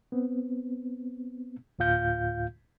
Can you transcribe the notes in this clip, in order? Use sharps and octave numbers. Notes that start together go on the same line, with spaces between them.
B3 C4
D2 A2 F4 F5 G6